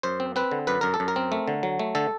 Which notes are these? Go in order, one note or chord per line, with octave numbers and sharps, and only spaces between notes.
F#2 C5
C4
C4 B4
D3
F#2 B4
F#2 A#4
A4
F#2
A#4
C4
A3
D3
F#3
A3
D3 A4